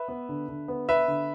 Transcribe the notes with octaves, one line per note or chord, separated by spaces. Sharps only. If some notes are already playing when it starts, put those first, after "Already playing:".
Already playing: B4 E5
B3
D3
D3
B3
B3 B4 E5
D3